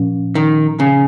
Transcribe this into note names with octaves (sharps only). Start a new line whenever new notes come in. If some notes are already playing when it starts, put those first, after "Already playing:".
Already playing: A#2 F3 C#4
D#3
C#3